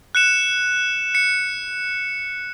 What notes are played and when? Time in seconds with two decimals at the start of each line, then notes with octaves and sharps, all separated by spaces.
0.15 F#6 C#7 E7
1.15 C#7